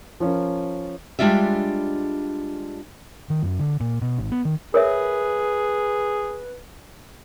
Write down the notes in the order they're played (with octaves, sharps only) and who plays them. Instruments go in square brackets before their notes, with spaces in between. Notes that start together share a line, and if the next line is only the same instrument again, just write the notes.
[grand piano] F3 C#4 A#4
[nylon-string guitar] G3 G#3 D4 F4 D5 E5
[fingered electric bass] D#3
F#2
D3
A#2
B2
G#1
B3
D#3
[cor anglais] G#4 [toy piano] A#4 C#5 E5 [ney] B4